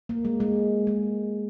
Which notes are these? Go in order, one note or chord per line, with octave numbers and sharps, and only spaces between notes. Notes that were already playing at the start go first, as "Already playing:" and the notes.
A#3
G#3
G#3
G#3